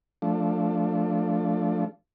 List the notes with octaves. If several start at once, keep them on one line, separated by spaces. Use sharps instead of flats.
F3 A3 D4